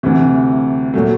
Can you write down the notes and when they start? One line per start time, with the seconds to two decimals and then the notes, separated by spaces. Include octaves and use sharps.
0.03 D2 C3 E3
0.94 A#2 F#3 A3